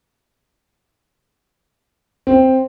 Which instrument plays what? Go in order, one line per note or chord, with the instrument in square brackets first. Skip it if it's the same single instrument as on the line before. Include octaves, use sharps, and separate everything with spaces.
[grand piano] C4